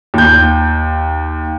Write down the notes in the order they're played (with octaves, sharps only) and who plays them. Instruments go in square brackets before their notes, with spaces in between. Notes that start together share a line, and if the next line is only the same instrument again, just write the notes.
[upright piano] D#2 G6